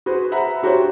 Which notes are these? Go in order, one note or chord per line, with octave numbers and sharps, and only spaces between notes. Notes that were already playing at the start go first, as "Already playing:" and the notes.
F#4 G#4 B4 C5
E5 F#5 A#5 B5
D4 F#4 G4 C5 C#5